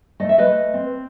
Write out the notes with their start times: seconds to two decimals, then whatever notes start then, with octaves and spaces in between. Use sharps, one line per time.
0.20 A3 D#5
0.29 E5
0.38 B4 D#5
0.47 A3
0.74 C4